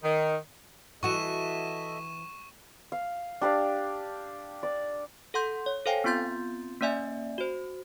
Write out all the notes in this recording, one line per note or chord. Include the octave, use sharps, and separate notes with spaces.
D#3
E3 F#4 A4 D#5 E5 C#6 D#7 E7
F5
D4 G4 D5 F5
D5
A4 F#5 C6 G6
C#5
A4 C5 F5 G5 G#5
B3 C4 F4 C6 G6 A6
A#3 C#4 D5 E5 G#5
F#4 C5